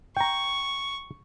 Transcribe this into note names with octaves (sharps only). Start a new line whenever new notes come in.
G5 A#5 C#6